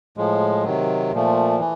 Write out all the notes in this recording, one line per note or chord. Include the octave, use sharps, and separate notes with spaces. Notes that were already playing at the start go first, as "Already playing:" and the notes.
A2 F3 G#3
C3 D#3 F#3
A#2 F3 A3
E3